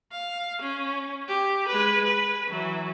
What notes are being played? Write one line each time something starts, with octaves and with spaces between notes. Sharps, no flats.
F5
C#4
G4
G#3 B4
B4
E3 F#3